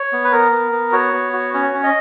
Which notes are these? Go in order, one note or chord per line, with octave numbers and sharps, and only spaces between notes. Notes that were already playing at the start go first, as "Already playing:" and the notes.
Already playing: C#5
B3
B4
B3 A#4
B3
B3
F#4 C#5
B3
F#4
C#4 C#5
C#4
D#5